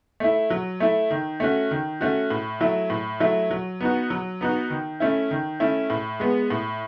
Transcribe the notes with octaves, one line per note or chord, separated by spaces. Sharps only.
A3 E4
F#3
A3 E4
D#3
A3 C#4 F#4
D#3
A3 C#4 F#4
A2
F#3 A3 E4
A2
F#3 A3 E4
F#3
B3 D#4 F#4
F#3
B3 D#4 F#4
D#3
A3 C#4 E4
D#3
A3 C#4 E4
A2
G#3 B3
A2